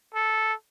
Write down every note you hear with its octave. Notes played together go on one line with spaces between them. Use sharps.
A4